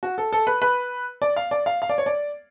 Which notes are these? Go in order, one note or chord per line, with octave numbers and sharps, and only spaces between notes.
F#4
A4
A4
B4
B4
D5
F5
D5
F5
F5
D5
C#5
D5